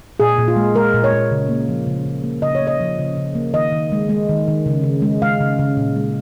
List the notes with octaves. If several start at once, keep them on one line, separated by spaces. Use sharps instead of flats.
A#2 G#4
A#2
F4
G#3
G#3 A#4
A#2
C#5
A#2
C#3
A#3
F3
C#3
C#3
A#3
C#3 D#5
C#5
A#3
D#5
F3
C#3
C#3
A#3
D#3 D#5
D#3
G#3
G#3
D#3
D#3
C#3
C#3
G#3
G#3 F5
C#3
C#3
A#2
G#3